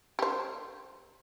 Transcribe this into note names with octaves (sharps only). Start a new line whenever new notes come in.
G4 C5